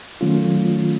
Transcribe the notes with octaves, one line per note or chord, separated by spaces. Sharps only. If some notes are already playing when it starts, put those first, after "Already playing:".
D#3 F#3 A3 C#4 F4